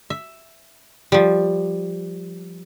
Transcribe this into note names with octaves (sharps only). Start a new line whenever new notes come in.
E5
F3 G3